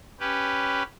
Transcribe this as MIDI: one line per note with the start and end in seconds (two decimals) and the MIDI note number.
0.20 0.83 61
0.20 0.83 67
0.20 0.83 71